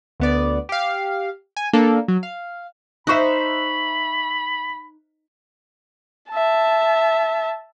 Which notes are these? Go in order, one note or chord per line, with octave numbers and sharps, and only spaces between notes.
D2 B3 D5
G4 F5
G#5
A#3 D4 A4 A#4
F#3
F5
D#4 C5 E5 B5 C#6 F#6
E5 A5